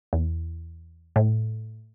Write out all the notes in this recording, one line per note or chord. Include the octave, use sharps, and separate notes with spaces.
E2
A2